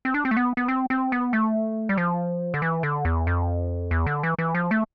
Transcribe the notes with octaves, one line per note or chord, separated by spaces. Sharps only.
C4
D4
C4
A3
B3
B3
C4
C4
B3
A3
G3
F3
D3
E3
D3
E2
F2
E2
D3
E3
E3
F3
A3